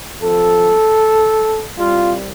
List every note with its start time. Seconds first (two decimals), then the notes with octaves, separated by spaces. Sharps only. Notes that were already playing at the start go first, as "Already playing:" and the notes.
0.20 F2 F3 A4
1.77 C2 C3 G3 F4